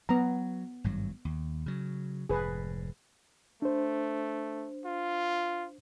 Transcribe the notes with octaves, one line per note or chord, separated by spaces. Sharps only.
F#3 B3 A#5
G#1 G2 F#3
D#2
C#3 F#3
F1 G#2 G#4 B4
A3 D4 C5
F4